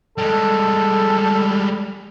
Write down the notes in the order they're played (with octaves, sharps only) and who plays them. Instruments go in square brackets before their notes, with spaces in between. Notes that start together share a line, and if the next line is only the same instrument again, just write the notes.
[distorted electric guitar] G3 G#3 [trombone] A4